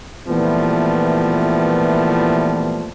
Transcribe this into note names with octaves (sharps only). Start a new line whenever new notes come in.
A#2 E3 F3 G3 A3 B3